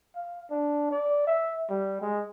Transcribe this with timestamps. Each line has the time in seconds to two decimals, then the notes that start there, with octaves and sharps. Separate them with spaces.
0.15 F5
0.51 D4
0.91 D5
1.27 E5
1.70 G3
2.01 G#3